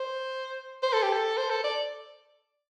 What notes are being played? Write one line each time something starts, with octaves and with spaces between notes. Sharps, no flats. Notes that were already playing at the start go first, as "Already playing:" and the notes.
Already playing: C5
C5
A4
G4
A4
C5
A4
D5